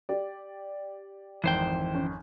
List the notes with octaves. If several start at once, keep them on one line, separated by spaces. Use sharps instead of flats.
G4 D5
G#1 F2 E3 C5 G5
C#4